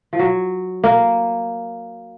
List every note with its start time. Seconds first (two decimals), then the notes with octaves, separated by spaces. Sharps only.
0.13 F3
0.19 F#3
0.84 A#3